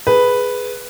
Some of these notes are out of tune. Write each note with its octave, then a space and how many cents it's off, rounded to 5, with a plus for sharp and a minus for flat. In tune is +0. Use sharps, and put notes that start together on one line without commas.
G#4 +10 B4 +0